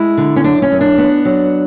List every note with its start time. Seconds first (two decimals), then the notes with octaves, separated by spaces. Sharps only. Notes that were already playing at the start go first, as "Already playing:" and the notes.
Already playing: G#3 E4
0.17 D3
0.36 C#4
0.44 F#2 D4
0.62 C#4
0.72 F#2
0.81 D4
0.98 B3
1.25 F#3